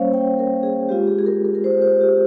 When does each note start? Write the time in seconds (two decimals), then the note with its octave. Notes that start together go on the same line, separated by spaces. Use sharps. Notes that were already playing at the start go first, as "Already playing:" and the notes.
Already playing: G3 A#3 C#4 C5 C#5 F5
0.14 G5
0.39 A#4
0.63 G#4
0.89 G#3 C4 F4 G4
1.08 G#4
1.19 G#4
1.26 A#4
1.44 A#4
1.55 A#4
1.64 C5
1.82 C5
2.01 G4